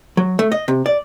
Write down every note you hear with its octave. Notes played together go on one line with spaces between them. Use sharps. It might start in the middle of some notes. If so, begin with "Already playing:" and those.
F#3
A3
D#5
C3
D5